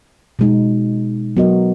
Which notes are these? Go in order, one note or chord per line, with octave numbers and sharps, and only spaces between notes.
B2 G#3 D#4
F#3 B3 F#4 A#4 D#5